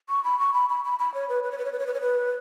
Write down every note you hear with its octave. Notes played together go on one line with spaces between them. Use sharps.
C#6
B5
C#6
B5
B5
B5
B5
C#5
B4
B4
C#5
B4
C#5
B4
C#5
B4
C#5
B4